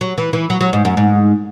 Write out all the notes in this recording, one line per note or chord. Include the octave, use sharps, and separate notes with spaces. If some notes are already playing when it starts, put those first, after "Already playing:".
F#3
E3
E3
F#3
F#3
G#2
F#2
G#2